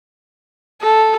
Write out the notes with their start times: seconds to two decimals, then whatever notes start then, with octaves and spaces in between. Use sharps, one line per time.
0.82 A4